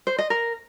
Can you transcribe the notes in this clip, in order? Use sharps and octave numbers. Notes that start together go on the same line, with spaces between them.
C5
D#5
A#4